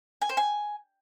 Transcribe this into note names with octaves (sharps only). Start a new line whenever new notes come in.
G#5
C5
G#5